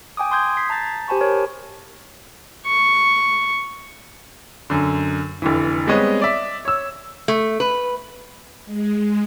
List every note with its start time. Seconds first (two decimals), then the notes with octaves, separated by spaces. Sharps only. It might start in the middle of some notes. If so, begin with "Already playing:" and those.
0.17 G5 G#5 D6 D#6
0.31 C6 D#6 G6 G#6
0.57 G#6 B6 C7
0.69 A5 A#5 G6 A6
1.08 G4 C5 G#5 A5 B5 C#6
1.21 A#4 C#5
2.66 C#6
4.70 F#2 D3
5.42 F1 D3 E3
5.87 G3 G#3 B3 C4 C#5 D#5
6.21 D5 E5
6.65 C#5 E6
7.28 A3
7.60 B4
8.66 G#3